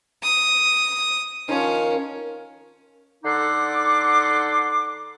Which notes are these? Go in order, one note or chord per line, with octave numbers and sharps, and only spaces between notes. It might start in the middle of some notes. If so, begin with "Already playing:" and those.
D#6
D#3 F3 C#4 F5
D3 D#4 A4 F#5 C6 D6